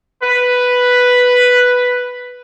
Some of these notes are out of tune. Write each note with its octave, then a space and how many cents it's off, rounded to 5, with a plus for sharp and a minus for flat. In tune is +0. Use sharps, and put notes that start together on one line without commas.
B4 +0